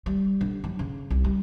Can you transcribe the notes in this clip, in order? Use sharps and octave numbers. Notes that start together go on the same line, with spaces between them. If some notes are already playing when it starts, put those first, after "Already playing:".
G3
D3
F#3
C#3
C2
G3